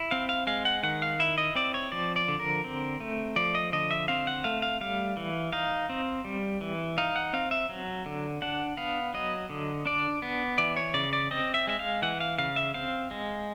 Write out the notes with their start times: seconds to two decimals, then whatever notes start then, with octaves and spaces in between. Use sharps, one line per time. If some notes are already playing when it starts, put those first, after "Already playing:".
Already playing: E4
0.11 C4 F5
0.29 F5
0.47 G#3 F5
0.65 F#5
0.83 D#3 F#5
1.02 F5
1.20 E4 E5
1.38 D#5
1.55 C4 D5
1.74 C#5
1.92 F3 D5
2.16 D5
2.28 D3
2.40 A#4
2.64 C4
3.00 A3
3.36 F3 D5
3.55 D#5
3.72 D3 D#5
3.91 E5
4.08 C4 F5
4.27 F#5
4.44 A3 F5
4.62 F5
4.81 G3 F5
5.17 E3
5.53 D#4 F5
5.89 C4
6.25 G3
6.61 E3
6.98 D#4 F5
7.16 F#5
7.33 C4 F5
7.51 E5
7.69 F#3
8.06 D3
8.42 D4 F#5
8.77 B3 F5
9.14 F#3 D#5
9.49 D3
9.86 D4 D5
10.22 B3
10.58 E3 D5
10.77 C#5
10.94 C#3 D5
11.13 D5
11.31 C4 D#5
11.54 E5
11.67 G#3 E5
11.79 F5
12.02 E3 F#5
12.20 F5
12.38 C#3 F5
12.56 E5
12.74 C4 F5
13.11 G#3